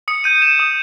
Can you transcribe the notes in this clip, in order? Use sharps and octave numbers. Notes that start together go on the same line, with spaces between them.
D#6 C#7
G6 D#7
G6 E7
D#6